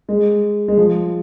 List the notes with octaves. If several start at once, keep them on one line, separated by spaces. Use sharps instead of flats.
G#3
G#3
F3